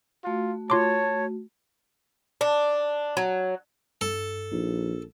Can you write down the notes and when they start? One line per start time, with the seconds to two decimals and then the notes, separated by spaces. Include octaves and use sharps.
0.24 A3 F4 F#4
0.70 F4 C#5 A5 C6 D6
2.41 D4
3.17 F#3
4.01 G2 A4
4.52 A#1 F3 D#4